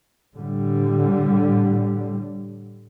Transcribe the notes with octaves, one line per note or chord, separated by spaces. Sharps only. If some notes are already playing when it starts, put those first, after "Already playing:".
A2 D3 G3